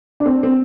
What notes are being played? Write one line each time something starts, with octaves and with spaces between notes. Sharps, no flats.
D4
C4
C4